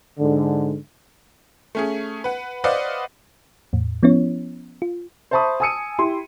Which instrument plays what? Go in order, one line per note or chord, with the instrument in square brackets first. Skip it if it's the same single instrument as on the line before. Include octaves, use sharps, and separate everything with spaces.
[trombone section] G#2 D3
[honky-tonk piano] A3 C#4 G#4
B4 F#5
B4 C5 D5 D#5 F5 F#5
[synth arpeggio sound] E2 A2
F3 B3 C#4 E4 C#5
F4
[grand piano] C5 E5 A5 B5 C#6 D#6
G#5 A5 D#6 E6 C#7 D#7
E4 G4 C6